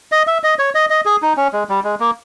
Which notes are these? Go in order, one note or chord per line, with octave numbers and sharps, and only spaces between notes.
D#5
E5
D#5
C#5
D#5
D#5
G#4
D#4
C#4
G#3
G3
G#3
A#3